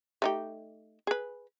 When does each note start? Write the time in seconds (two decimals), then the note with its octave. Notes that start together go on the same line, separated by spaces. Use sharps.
0.22 A3 D#4 G4
1.07 G#4 B4